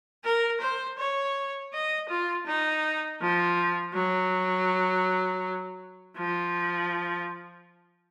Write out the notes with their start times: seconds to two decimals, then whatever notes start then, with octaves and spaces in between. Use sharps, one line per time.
0.24 A#4
0.61 C5
0.99 C#5
1.73 D#5
2.09 F4
2.47 D#4
3.21 F3
3.95 F#3
6.17 F3